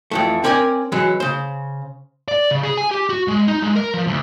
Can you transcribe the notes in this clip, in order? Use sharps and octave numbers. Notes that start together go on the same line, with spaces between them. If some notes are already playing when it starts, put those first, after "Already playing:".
F2 E3 A3
C4 C#4 A#4 D5 G5 G#5
E3 F#3 G#3 C#4
C#3 C5
D5
C#3
G#4
G#5
G4
F#4
G#3
D#4
G#3
A#4
F3
D2